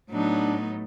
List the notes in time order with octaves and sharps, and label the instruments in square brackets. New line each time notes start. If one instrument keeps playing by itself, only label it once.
[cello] A2 [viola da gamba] F#3 B3 D#4 [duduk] D4